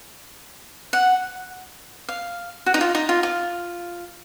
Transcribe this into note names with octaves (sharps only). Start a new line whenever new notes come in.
F#5
F5
F#4
D#4
F4
D#4
F4
F4